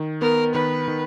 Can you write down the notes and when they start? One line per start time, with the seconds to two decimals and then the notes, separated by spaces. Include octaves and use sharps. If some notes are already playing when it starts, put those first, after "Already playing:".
Already playing: D#3
0.21 B3 A#4
0.54 D#3 B4
0.88 D#3